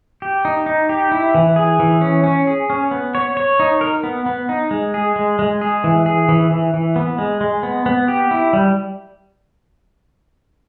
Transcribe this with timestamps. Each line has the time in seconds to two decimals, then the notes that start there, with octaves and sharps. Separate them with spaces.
0.22 G4
0.45 D#4
0.66 D#4
0.89 G4
1.12 E4
1.35 E3
1.56 G#4
1.80 E3
2.01 C#4
2.24 C#4
2.47 G#4
2.70 C#4
2.91 B3
3.15 C#5
3.37 C#5
3.60 D#4
3.81 A#4
4.03 B3
4.26 B3
4.49 D#4
4.71 G#3
4.94 G#4
5.16 G#3
5.39 G#3
5.61 G#4
5.84 E3
6.06 G#4
6.29 E3
6.51 E3
6.74 E3
6.96 B3
7.18 G#3
7.41 G#3
7.63 B3
7.86 B3
8.08 G4
8.31 E4
8.53 G3